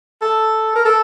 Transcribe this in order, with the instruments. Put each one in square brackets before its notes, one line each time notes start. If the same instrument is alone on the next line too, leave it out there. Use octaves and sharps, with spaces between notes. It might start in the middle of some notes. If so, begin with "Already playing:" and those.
[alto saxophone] A4
A#4
A4